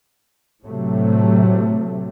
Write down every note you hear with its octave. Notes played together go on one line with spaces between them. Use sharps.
A2 C3 F#3 A3